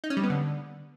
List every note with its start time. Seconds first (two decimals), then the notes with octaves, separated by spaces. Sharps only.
0.04 D#4
0.10 C#4
0.17 G3
0.23 B3
0.30 D3